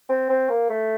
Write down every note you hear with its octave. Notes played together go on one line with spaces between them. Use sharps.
C4
C4
A#3
A3